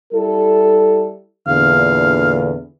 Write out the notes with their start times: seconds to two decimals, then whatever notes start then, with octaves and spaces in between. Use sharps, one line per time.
0.14 G3 E4 A4
1.47 E2 A#2 D3 F5